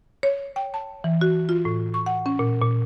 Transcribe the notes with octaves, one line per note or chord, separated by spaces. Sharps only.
C#5
G5
A5
E3
F#4
F4
A2
C#6
F#5
C#4
A#2
A#2